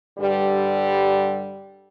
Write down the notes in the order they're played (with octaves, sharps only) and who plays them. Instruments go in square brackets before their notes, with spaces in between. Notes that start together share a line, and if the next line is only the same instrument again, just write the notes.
[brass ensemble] G2 D3 G3